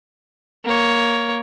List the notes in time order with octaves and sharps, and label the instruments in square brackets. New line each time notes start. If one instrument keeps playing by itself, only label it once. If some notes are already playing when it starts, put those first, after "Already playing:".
[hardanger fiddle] A#3 C#5